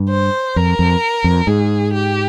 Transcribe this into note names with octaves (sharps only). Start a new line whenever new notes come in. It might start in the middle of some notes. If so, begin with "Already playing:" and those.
Already playing: G2
C5
F2 A#4
F2
F2
G#2 G#4
G4